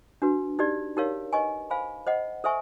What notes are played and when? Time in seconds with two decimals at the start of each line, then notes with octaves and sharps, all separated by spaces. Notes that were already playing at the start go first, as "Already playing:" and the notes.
0.22 D4 F#4 B4
0.59 D#4 G4 B4 D5
0.97 D#4 G4 A#4 C#5 F5
1.33 B4 D#5 G#5 C#6
1.70 C5 F5 G#5 B5
2.07 C5 D#5 F#5
2.44 A4 C5 E5 G#5 C#6